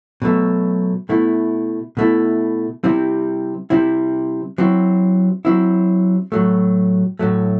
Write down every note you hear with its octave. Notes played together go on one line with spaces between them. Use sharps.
B2 F#3 A3
B2 A3 E4
B2 A3 E4
C3 G3 C4 E4
C3 G3 C4 E4
F#3 C4 E4
F#3 C4 E4
A2 F#3 A3
A2 F#3 A3